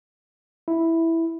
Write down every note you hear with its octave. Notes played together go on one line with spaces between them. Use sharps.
E4